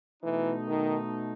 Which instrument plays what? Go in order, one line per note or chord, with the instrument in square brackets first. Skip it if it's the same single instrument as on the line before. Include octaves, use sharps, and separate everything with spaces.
[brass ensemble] B2 A3 D#4 [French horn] E3
[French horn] D#3